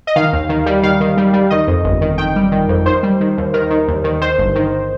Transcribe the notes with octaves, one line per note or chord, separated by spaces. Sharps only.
D#5
D#3 F5
D#2
D#3
G3
D#3 F5
D#3
G3
G3
D#3 D#5
F2
G1
D#3
D#3 G5
G3
D#3
F2
D#3 C5
G3
D#3
D#2
D#3 A#4
D#3
D#2
D#3
D#3 C5
G1
D#3